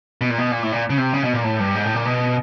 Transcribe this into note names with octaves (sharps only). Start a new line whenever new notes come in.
B2
A#2
B2
A#2
A2
A#2
C#3
C3
C#3
B2
A#2
A2
G2
G#2
A2
A#2
B2